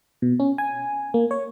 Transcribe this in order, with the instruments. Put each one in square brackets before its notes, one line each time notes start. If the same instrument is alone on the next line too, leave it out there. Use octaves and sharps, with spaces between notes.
[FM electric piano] B2
C#4
G#5
A#3
C#5